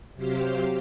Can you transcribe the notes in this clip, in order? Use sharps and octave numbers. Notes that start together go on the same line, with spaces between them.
C3 F#3 G4 C5 F5